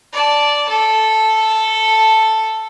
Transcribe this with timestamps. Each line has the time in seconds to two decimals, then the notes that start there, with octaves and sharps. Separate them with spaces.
0.13 D5 A5
0.69 A4